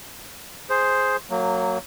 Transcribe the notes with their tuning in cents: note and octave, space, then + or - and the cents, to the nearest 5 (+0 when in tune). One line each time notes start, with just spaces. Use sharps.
G#4 +0 C5 +0
F#3 +0 A#3 -25